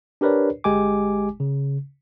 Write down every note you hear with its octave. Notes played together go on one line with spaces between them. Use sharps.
D4 G4 A#4 B4 C#5 D5
G1 G#3 G4 G#5 D6
C#3